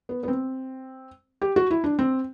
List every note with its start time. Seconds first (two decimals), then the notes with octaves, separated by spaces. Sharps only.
0.09 B3
0.23 B3
0.28 C4
1.42 G4
1.56 F#4
1.71 E4
1.84 D4
1.99 C4